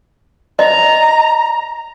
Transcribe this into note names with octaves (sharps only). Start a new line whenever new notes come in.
D#5 A#5